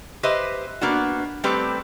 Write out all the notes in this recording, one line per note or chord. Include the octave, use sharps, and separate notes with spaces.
G4 B4 C5 D#5 E5
A#3 B3 D4 F#4
G3 A3 C4 G4 B4